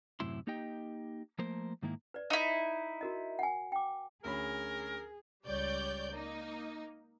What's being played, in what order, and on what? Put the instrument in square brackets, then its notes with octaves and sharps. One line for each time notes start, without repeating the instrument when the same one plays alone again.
[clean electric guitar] F#2 A2 C3 E4 C6
A#3 D#4 G4 D#5 G5
F3 A3 A#3 A#4 C5
G#2 D#3 A#3 E4
[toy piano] B4 D5
[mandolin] D#4 E4
[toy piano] F#4 A#4 D#5
F#5 G#5
G5 D6
[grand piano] D2 C#4 B5 [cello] G#4 [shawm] A#4
[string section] C#2 G3 C#5 D5 G6
A#3 D#4